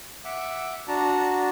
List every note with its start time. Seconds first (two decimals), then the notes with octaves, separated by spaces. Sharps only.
0.25 E5 F#5 D6
0.88 D4 F#4 A5 A#5